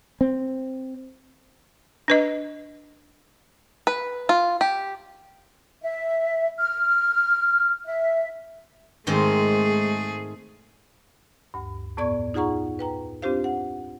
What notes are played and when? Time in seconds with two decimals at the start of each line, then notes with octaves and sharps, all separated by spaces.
0.21 C4
2.08 D4 B4 D#5
3.87 B4
4.29 F4
4.61 G4
5.82 E5
6.58 F6
7.85 E5
9.07 G#2 D#3 G#3 A3 C4 G#4
11.54 D2 G2
11.97 F2 A2 B3 D5 C#6 G#6
12.34 D#4 F4 G#4 F#5 A#5 C#6
12.79 B4 G5 A#5
13.22 C4 D4 F4 G4 C5 F5
13.44 F#5